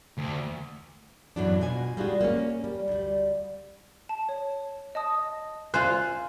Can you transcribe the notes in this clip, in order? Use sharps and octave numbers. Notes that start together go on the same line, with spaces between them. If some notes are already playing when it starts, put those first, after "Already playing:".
D2
F#2 A2 E3 F#3 B3 D4
B2 F4 F#4 G#5
G3 G#3 D4 F4 F#4
A#3 C4 C#4
G3
D2 G3
A5
C#5
D#5 A5 D#6
D#5
F4 C5 G#5 F#6